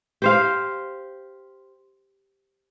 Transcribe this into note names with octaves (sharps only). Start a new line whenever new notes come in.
G4 C5 F5